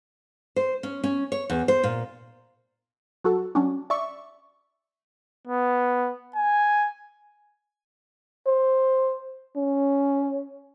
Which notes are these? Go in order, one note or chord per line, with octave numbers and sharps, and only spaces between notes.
C5
C#4
C#4
C#5
E2
C5
A#2
F#3 F#4 A4
F#3 C#4 D4
D5 E5 C#6
B3
G#5
C5
C#4